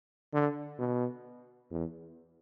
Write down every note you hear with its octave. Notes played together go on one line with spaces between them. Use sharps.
D3
B2
E2